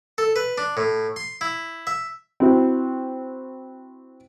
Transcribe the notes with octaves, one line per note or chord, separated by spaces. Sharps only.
A4
B4
D4
A2
C6
E4
E5
C4 E4 F#4